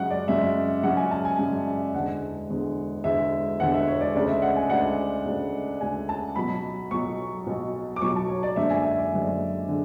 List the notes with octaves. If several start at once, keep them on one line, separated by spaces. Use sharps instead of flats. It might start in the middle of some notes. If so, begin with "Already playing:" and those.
Already playing: F#2 C#3 G#3 C#4 F#5
D5
F#2 C#3 G#3 C#4 E5
F#2 C#3 G#3 C#4 F#5
G#5
A5
G#5
F#2 C#3 G#3 C#4
E1 E2 D3 G#3 F#5
E1 E2 D3 G#3
E1 E2 D3 G#3 E5
E1 E2 D3 G#3 F#5
E5
C#5
D5
D2 C#3 G#3 D4 D5
E5
F#5
G#5
D2 C#3 G#3 D4 F#5
D2 C#3 G#3 D4
D2 C#3 G#3 D4 G#5
A5
B1 B2 F#3 B5
B1 B2 F#3 C#6
B1 B2 F#3
D6
B1 B2 F#3 C#6
A5
C#5
D5
F#1 F#2 D3 G#3 D4 E5
G#5
E5
D5
F#1 F#2 D3 G#3 D4
D3 G#3